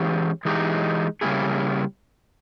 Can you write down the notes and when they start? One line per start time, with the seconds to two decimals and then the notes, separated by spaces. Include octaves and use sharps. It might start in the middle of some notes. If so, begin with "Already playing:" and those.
Already playing: E3 G#3 C#4 G4
0.45 E3 G#3 D#4 G4
1.21 C#3 G3 A#3 E4 G#4